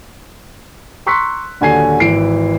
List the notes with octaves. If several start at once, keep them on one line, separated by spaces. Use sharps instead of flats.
A#5 C6 C#6 E6 F#6 B6
D#1 D3 F#4 G#5 G#6 C7
G#1 E3 B4 C7 D7